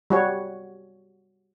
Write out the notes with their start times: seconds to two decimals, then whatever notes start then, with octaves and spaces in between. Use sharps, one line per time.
0.10 G3 F#4 C#5